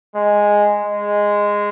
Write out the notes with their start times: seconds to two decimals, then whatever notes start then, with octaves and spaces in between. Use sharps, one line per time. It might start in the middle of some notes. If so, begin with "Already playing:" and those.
0.15 G#3
0.84 G#3